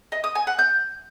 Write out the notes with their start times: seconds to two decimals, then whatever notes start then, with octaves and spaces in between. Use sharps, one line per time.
0.12 D#5
0.24 D#6
0.35 G#5
0.47 F#5
0.59 G6